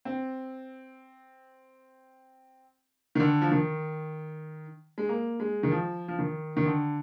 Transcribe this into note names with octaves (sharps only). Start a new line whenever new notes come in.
C4
D#3
D3
F3
D#3
G#3
A#3
G#3
D#3
F3
F3
D#3
D#3
D3